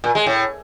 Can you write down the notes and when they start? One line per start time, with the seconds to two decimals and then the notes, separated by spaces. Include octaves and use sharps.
0.04 A#2
0.15 G#3
0.26 A2